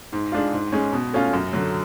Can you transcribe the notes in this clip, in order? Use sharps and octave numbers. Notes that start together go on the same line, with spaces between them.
G#2
G#3 D4 F4
G#2
G#3 C#4
B2
A3 C#4 F4
F#2
D3 F#3